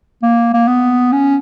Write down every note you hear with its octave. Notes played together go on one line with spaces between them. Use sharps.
A#3
A#3
B3
C#4